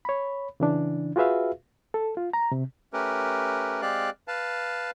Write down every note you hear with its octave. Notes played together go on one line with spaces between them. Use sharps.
C#5 B5
C#3 E3 D4
F4 F#4 G#4 B4 E5 F5
A4
F4
A#5
C3
A3 C#4 G4 A#4 B4
G#3 C4 G4 D5 F5 F#6
B4 F5 A5